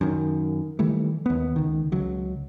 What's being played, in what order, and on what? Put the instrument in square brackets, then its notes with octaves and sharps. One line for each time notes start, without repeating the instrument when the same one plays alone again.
[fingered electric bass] F#2 D#3
D#3 E3 G3 A3
D#2 B3
C#2 D#3
C#2 F#3